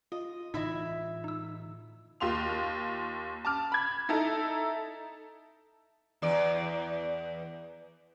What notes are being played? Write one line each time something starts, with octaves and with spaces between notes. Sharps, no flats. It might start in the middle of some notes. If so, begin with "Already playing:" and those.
F4 D#5
A2 D3 E3 D#4 E4 D#5 E5 B5
D#4 E6
D#2 F4 C6 F7
A5 D6 F6
B5 G#6
D#4 E4 A4 A#5
E2 D5